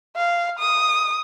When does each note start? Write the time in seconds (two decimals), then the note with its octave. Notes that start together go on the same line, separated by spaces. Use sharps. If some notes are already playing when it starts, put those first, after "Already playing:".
0.16 F5
0.59 D#6